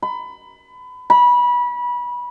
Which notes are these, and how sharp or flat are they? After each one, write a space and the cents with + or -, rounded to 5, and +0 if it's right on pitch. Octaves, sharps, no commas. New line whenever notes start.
B5 +30
B5 -25